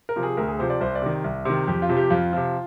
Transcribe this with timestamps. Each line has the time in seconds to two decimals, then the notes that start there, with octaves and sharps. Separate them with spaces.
0.09 A#4
0.16 C3 F3
0.23 G#4
0.37 D2 A#4
0.48 G#4
0.59 C3 F3 C5
0.70 D5
0.80 C2 C5
0.95 D5
1.02 C3 D#3
1.24 C2
1.45 C3 D#3
1.68 F2 G4
1.82 F4
1.89 C3 F3
1.97 G4
2.10 F2 F4
2.33 C3 F3